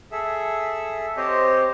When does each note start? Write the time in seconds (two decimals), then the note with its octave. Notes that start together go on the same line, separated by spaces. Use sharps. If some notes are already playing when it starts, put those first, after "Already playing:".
0.12 G#4 A4 E5
1.17 C4 G4 C5 C#5 D#5